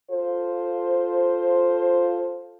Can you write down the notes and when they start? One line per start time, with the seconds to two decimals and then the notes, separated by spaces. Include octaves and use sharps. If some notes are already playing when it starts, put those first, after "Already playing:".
0.11 F4 A4 C5